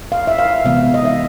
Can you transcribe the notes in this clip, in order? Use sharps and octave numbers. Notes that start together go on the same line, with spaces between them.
F5
E5
F5
C3 E3 G#3 B3 F5
D#5
E5